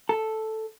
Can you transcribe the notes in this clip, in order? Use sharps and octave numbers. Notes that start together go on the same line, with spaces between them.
A4